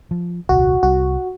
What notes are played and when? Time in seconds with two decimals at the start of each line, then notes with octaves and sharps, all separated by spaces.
0.11 F3
0.49 D#1 C2 F#4
0.83 C2 G3 F#4